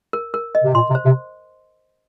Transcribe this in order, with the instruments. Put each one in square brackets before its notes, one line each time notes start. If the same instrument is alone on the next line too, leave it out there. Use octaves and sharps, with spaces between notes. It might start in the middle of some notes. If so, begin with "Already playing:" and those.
[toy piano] A#4
A#4
D#5
[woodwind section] C3
[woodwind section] A#2 [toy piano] C6
[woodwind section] C3
[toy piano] C5
[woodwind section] C3